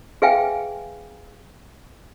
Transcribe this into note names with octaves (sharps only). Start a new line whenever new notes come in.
G#4 B4 E5 F5 G5 G#5